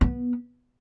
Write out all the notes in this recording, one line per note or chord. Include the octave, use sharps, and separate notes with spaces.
B3